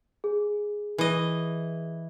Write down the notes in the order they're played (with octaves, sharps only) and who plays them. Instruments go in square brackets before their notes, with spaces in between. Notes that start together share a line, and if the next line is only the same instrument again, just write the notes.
[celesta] G#4
[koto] E3 D#5